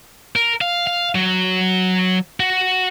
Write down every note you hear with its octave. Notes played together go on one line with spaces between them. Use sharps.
A#4
F5
F5
F#3
F#4